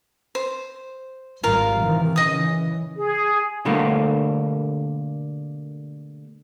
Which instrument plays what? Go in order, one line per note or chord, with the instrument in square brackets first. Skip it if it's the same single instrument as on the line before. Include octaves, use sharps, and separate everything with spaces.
[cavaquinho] C5
[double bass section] G#1 G#2 G3 [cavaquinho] F4 A#4 F5
[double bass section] C3 D#3 E3
[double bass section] C#3 E3 [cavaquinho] D#5 D#6
[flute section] G#4
[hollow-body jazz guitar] B2 D3 G3 A3 A#3